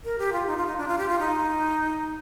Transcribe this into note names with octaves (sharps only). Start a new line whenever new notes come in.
A#4
G4
F4
D#4
F4
D#4
D4
F4
G4
F4
D#4